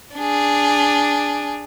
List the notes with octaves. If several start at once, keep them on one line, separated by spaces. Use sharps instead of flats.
D4 G#4